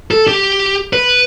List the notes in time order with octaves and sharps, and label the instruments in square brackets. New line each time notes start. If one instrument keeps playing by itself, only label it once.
[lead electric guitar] A4
G4
B4